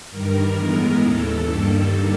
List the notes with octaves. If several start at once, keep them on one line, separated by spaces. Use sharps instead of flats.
G2 D#3 G3 A#4
A2 E3 G#3 B3 A#4
D#2 C#3 E3 A4
G2 D#3 G3 A#3 A4